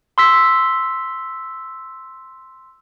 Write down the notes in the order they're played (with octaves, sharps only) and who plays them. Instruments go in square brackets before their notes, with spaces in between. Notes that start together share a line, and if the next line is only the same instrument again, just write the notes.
[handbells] C6 E6 B6